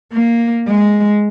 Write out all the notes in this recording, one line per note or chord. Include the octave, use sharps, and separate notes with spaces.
A#3
G#3